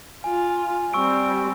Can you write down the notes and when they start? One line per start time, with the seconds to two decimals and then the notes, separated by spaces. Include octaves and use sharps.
0.24 F4 G#5
0.93 G3 C4 C#6 E6 D7